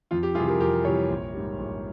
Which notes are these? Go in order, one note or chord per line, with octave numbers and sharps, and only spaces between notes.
F2 F4
G4
C3 E3 G3 F4 G#4
G4 A#4
F2 G4 A#4
C3 E3 G3 A#4 C#5
A#1
G#2 G3
A#1